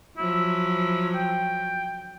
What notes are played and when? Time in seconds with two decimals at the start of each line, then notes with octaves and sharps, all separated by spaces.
0.17 F3 F#3 E4
1.15 G5